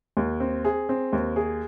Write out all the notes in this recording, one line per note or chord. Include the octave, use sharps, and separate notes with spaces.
D#2
C4
G#4
C4
D#2
G#4